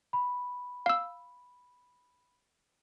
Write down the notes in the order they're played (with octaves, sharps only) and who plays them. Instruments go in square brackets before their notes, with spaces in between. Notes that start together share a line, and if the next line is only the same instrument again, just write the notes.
[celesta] B5
[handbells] F5 E6